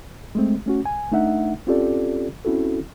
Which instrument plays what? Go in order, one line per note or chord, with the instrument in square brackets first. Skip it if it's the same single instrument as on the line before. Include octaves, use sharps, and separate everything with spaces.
[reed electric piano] G#3 A3 C4
A3 C#4 F#4
C2 G#5
A3 D4 D#4 E5 F#5
C4 C#4 F4 G4 A4 D5
C4 C#4 E4 F#4 A4